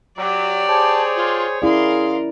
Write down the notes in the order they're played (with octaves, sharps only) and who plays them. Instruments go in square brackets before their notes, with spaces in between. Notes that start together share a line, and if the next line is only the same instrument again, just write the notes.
[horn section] F#3 [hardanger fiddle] G4 D5
[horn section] G#4 C5 C#5 [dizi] A5
[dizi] F4
[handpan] C#4 E4 D5 [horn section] G#4 C6 [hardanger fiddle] A#4 [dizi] F5